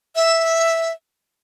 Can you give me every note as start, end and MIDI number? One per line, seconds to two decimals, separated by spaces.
0.16 0.92 76